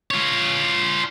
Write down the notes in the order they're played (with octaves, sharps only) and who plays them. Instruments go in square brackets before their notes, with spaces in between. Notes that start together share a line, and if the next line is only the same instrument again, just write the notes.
[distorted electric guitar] F4 C#5